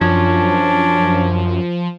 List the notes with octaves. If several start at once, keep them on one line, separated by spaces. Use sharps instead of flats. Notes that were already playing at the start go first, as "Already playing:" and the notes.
F#2 F3 C#4 D4